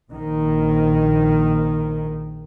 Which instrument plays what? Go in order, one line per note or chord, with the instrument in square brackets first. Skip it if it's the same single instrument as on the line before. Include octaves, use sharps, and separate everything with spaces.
[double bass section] A#1 D#3